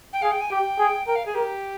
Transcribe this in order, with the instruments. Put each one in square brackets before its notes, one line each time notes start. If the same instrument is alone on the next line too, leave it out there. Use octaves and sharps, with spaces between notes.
[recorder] G5
[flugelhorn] G#4 [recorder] F5
[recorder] G5
G#5
[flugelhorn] G4 [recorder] G5
[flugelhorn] G#4
[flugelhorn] A#4 [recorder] G5
[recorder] F5
G#4
[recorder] G4 [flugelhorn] A#4